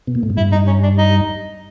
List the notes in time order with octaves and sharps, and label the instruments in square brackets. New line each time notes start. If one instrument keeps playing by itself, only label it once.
[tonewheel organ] B2
A#2
A2
G#2
[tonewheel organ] G2 [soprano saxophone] E4
[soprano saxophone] D#4
C#4
D4
D#4